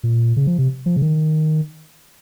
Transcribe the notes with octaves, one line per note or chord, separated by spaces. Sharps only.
A#2
C#3
F3
C3
F3
C#3
D#3